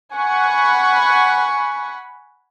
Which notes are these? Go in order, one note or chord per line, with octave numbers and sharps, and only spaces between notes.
F#5 G#5 B5 C#6